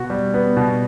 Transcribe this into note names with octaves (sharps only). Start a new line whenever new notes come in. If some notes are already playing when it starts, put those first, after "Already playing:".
Already playing: B2 B3 F#4
G3
B3
B2